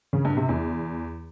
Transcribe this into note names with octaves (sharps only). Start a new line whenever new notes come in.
C#3
G2
C3
E2